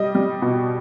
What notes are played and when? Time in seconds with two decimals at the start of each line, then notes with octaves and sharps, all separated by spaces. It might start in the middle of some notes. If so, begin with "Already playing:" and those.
Already playing: G3 D#5
0.15 G3
0.42 B2